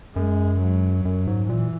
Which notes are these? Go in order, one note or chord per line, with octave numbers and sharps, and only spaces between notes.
F#2 G#3
F#3
F#2
G#2
A#2 E3